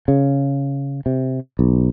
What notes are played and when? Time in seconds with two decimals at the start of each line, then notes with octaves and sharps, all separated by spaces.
0.08 C#3
1.06 C3
1.59 B1